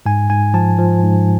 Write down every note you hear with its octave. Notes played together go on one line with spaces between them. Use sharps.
G#2 G#5
G#2 G#5
F3 A5
F3
G#2